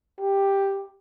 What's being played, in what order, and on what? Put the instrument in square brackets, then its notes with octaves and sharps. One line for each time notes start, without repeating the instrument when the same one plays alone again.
[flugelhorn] G4